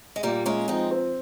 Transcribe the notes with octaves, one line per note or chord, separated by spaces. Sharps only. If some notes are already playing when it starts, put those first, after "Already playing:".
G#3
A#2 G3 A#3
G#3 A#3 C#4
F3 C4 D#4
C4